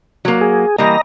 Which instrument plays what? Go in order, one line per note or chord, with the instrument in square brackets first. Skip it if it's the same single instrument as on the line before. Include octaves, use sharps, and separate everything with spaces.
[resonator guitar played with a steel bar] F#3 A#3
[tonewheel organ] G#4
[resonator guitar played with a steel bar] E3 G3 A#3 [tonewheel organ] D#5 A#5